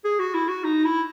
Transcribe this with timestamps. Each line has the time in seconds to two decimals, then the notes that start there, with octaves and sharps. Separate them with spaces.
0.04 G#4
0.19 F#4
0.34 E4
0.49 F#4
0.64 D#4
0.84 E4